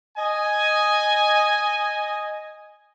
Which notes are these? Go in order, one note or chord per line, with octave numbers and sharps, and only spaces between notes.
D#5 G#5